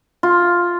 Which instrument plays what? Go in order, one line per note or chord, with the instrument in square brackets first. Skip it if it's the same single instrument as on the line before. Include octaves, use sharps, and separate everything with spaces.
[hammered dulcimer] F4